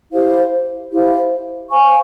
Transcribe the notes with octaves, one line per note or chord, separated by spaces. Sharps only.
E4 G4 C5 F5
E4 G4 C5 F5
C5 F5 G#5 C#6